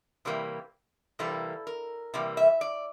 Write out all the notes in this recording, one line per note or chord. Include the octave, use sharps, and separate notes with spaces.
C3 E3 G3 A#3
C3 E3 G3 A#3 A4
A#4
C3 E3 G3 A#3
E5
D5